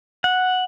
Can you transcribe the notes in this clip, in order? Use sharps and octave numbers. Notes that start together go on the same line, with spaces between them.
F#5